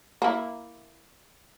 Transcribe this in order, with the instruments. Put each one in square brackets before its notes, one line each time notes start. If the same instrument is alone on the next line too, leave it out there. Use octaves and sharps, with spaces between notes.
[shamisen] A#3 E4